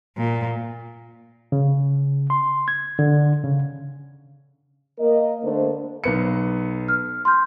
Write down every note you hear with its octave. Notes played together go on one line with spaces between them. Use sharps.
A#2
C#3
C6
G#6
D3
C#3
A#3 A#4 D#5
D3 A3 A#3 D4 C5
B1 B3 C#7
F6
C6 F6 G6